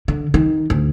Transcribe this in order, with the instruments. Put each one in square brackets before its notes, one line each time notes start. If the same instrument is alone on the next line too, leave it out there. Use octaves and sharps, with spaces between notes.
[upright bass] D3
D#3
D2